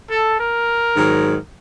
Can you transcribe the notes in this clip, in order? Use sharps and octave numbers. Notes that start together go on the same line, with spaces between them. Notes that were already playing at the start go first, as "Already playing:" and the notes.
A4
A#4
G#2 D#3 F#3